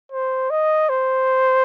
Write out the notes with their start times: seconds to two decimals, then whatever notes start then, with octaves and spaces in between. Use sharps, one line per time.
0.12 C5
0.50 D#5
0.89 C5